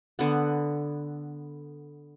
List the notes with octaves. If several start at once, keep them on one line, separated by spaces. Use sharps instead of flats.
D3 B3